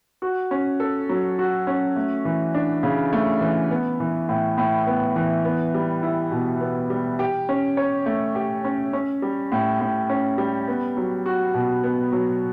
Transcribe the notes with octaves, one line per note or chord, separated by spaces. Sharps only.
F#4
C#4
A4
F#3
F#4
C#4
A3
E3
D4
C#3
A3
E3
B3
E3
A2
A2
B3
E3
B3
G3
E4
B2
B3
G3
G4
C#4
C#5
A3
G4
C#4
C#4
G3
A2
A2
C#4
G3
B3
F#3
F#4
B2
B3
F#3